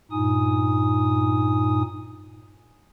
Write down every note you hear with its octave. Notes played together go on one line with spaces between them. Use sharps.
G2 A#2 D#4 G#5 D#6